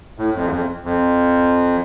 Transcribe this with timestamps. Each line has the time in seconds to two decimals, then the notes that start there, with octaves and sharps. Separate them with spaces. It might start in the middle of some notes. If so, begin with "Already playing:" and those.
0.18 A2
0.34 F2
0.45 E2
0.50 F2
0.84 F2